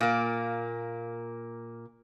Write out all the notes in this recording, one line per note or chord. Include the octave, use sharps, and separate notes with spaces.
A#2 A#3